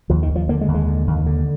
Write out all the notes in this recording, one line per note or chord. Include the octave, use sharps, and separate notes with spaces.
D#2 F3
D#3
D#2
F3
D3 A#3
G#3
D#2
G#3
D3
D#2
D3